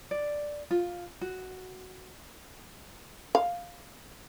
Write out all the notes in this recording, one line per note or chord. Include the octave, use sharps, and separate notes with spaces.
D5
F4
F#4
F5